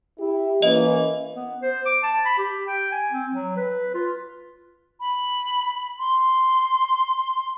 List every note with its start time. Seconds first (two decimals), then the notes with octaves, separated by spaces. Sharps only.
0.19 E4 G4
0.62 E3 A#3 C#4 D#5
1.36 B3
1.62 C5
1.86 D6
2.03 A5
2.26 B5
2.38 G4
2.67 G5
2.92 G#5
3.12 C4
3.34 F#3
3.57 B4
3.95 F4
5.01 B5
5.99 C6